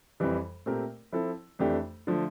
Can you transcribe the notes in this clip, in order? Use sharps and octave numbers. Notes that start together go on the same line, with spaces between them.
F2 E3 G3
A#2 A3 C4 G4 A#4
F3 C4 E4 A4
F2 E3 A3 D4 G4
D3 F3 A3